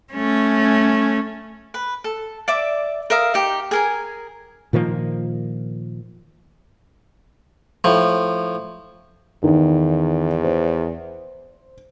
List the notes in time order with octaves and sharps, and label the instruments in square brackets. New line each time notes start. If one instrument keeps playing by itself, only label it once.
[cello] A3 C#4
[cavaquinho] B4
A4
D5 E5 D6
A#4 E5 F5 D#6
D#4 G4
G#4 A#4 G#5
[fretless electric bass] A#2 D#3 F3 A#3
[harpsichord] A2 F3
[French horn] E2 [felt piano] D#3
[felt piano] C5